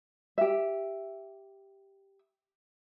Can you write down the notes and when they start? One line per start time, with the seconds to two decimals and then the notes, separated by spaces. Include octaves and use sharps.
0.38 G4 E5